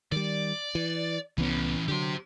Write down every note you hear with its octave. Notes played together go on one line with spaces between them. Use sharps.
D#3 G3 D5
E3
C2 E3 B3 C#4
D3 F#3 G4 C5